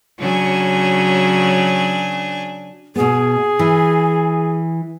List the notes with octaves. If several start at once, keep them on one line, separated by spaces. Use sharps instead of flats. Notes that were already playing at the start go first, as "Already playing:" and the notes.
C#3 F#3 D4 G#5
B2 B3 G#4
E3